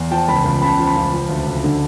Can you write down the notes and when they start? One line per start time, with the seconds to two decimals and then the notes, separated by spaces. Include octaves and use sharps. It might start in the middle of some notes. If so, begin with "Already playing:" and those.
Already playing: E2
0.11 F3 G5 A5
0.28 C#2 A5 B5
0.44 C#2
0.61 C#3 A5 B5
0.79 F3
0.87 A5 B5
0.96 C#2
1.13 F3
1.29 D2
1.46 D2
1.64 D3